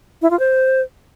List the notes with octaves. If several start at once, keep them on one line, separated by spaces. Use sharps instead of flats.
E4
F4
C5